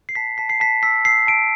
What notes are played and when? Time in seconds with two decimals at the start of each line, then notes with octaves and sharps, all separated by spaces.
0.09 C7
0.15 A5 B6
0.38 A5 B6
0.49 C7
0.60 A5 B6
0.83 E6 B6
1.05 E6 C7
1.27 A5 D7